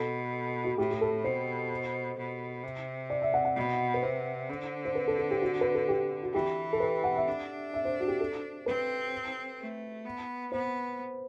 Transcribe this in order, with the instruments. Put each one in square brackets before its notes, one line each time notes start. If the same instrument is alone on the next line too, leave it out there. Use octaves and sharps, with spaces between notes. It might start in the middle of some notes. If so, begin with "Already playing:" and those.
Already playing: [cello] B2 [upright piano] A4
[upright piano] F#4
[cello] A2 [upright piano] G4
[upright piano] G4
A4
[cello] B2 [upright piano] C5
[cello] B2
C3
[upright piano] D5
E5
F#5
F#5
[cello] B2
[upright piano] B4
[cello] C3 [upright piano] C5
[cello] D3
[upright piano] C5
B4
A4
A4
G4
F#4
B4
A4
G4
F#4
[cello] E3 [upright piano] G4
[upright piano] A4
B4
F#5
E5
[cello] D4
[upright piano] E5
C5
F#4
G4
A4
[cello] C4 [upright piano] B4
[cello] A3
B3
[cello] B3 [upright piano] C5